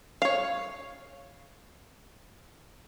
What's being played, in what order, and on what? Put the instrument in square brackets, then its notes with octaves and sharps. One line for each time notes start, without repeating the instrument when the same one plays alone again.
[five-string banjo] C#5 F5